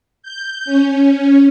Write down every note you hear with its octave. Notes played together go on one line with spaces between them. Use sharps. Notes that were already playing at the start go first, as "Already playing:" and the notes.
G6
C#4